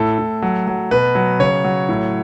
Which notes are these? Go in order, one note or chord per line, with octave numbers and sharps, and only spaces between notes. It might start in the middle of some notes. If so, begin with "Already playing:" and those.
Already playing: A2 A4
A2
F#3
F#3
B2 B4
F#3
C#3 C#5
F#3
A2